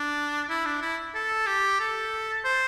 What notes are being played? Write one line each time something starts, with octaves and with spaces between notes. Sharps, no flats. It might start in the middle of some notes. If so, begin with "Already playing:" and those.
Already playing: D4
E4
D4
E4
A4
G4
A4
C5